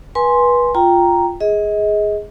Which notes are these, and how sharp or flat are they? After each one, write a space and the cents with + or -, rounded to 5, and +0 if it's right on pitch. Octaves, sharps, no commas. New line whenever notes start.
B4 -25 G#5 +0 C6 +0
F4 +0 G5 +0 A#5 +0
G#4 +0 D#5 +30